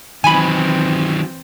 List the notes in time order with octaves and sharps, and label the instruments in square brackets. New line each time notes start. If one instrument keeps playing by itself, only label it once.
[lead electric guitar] D#3 F#3 [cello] E3 C4 [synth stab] G#5 B5